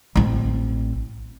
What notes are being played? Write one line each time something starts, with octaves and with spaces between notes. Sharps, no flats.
A1 C4